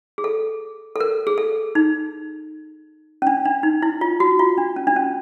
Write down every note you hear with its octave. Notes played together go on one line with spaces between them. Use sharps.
G#4
A4
A4
A#4
G#4
A4
D#4
C#4
D4
D4
D#4
E4
F4
F#4
F4
D4
C#4
D4
C#4